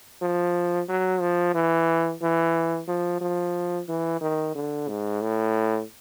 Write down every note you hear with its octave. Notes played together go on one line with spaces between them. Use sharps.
F3
F#3
F3
E3
E3
F3
F3
E3
D#3
D3
G#2
A2